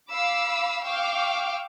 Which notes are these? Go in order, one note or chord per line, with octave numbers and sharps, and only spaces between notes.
F5 B5 D6 E6
F5 G5 C#6 D6 E6 F6